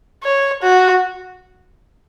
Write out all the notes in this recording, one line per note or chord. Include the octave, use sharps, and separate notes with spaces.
C#5
F#4